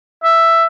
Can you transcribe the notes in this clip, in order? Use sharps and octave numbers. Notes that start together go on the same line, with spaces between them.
E5